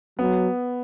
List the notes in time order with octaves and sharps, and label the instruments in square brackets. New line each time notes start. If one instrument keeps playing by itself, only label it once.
[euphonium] F#3 [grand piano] B3